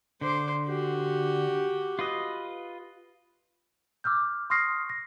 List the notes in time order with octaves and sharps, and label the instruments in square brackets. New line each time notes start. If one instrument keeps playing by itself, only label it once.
[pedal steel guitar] D3 [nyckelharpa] C5 D6
[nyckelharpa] F#4 G4
[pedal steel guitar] F4 B4 D#5
[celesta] D6 E6 F6 G6
C6 C#6 D#6 F6 A#6 C7
A#6